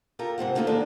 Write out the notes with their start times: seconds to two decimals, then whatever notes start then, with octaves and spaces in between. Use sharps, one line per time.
0.19 F4 G4 A4 A#4
0.38 G#2 C3 C5 F#5
0.55 A3 A#3 D#4 F4 G#4 A4
0.67 D#3 G#3 D4 A4 A#4